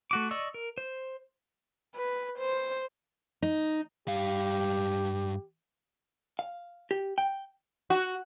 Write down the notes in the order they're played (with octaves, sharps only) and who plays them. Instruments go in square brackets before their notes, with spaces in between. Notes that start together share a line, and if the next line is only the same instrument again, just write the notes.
[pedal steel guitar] A3 F#4 D6
D5 D#5 C#6 E6
A#4
C5
[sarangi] B4
C5
[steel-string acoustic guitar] D#4
[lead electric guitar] G2 F5 [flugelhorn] G4
[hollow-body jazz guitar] F5
G4
G5
[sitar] F#4